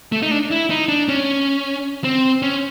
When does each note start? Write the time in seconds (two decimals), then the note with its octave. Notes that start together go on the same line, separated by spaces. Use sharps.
0.12 A3
0.22 D#4
0.31 D4
0.51 E4
0.70 D#4
0.88 D4
1.09 C#4
2.04 C4
2.42 C#4